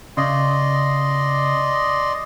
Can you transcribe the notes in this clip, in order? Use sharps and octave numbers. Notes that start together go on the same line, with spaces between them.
C#3 D5 D#5 C6